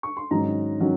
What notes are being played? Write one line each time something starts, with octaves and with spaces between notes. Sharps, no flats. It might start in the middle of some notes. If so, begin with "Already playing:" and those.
C#6
C6
G#2 D#3 F#3 C#4 A#5
D#3 F#3 C#4